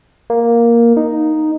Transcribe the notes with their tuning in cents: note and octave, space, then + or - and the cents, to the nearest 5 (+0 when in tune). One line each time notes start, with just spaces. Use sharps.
A#3 +5
D#4 -5